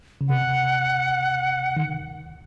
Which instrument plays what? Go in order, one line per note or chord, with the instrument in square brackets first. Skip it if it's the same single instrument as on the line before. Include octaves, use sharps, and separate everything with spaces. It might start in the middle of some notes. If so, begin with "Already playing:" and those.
[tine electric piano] C#3
[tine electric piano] C3 [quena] F#5
[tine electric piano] D#3